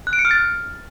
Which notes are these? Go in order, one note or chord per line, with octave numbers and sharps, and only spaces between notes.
F#6
D7
C#7
F6
A6